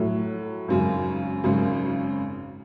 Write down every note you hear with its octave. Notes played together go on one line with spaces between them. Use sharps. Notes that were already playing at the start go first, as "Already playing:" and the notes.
Already playing: A2 F#3 A3
G#1 F#2 C#3
G#1 F#2 C#3